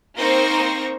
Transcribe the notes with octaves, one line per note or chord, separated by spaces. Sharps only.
A#3 C4 D#4 C5 C#6 A#6